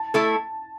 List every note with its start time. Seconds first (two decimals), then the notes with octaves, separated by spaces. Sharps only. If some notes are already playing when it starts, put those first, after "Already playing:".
Already playing: A5
0.14 A3 E4 A4